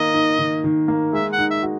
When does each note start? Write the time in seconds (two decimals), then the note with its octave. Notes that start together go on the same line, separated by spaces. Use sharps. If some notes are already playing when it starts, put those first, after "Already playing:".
Already playing: D#3 A#3 D#5
0.14 D#4
0.39 D#3
0.64 D#3
0.88 A#3
1.13 G#3 E5
1.32 F#5
1.38 D#4
1.50 E5
1.63 F#4